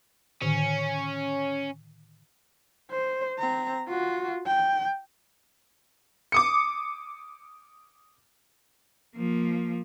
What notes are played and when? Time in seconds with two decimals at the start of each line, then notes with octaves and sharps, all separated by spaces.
0.42 A2 D3 D#3 C#4
2.91 C5
3.39 C4 A#5
3.89 F4 F#4
4.47 G5
6.32 D6 D#6 C#7
9.16 F3 A#3